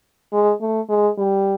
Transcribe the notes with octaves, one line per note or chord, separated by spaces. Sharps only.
G#3
A3
G#3
G3